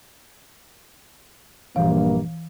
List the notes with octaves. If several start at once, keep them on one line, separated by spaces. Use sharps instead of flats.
A#1 G2 E3 A#3 F5